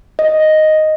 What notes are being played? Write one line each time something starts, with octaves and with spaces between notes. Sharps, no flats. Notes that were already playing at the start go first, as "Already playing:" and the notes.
D#5